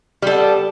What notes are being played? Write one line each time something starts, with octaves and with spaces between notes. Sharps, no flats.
G3 B3 A4